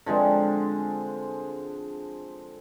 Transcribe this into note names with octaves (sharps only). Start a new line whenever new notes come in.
D3 F3 G#3 C4